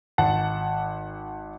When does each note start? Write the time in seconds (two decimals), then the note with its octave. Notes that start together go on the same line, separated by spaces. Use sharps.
0.18 G#1 F#5 A5